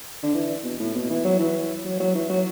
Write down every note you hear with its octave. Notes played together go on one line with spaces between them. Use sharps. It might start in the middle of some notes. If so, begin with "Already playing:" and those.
D3
E3
B2
A2
B2
E3
F#3
E3
F#3
F#3
E3
F#3